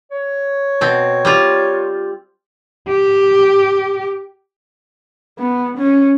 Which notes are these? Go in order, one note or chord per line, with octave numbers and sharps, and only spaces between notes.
C#5
B2 C4
G3 C4 F4
G4
B3
C#4